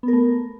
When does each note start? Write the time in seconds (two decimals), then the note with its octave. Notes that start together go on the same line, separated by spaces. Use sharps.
0.03 B3
0.08 A#4
0.13 A3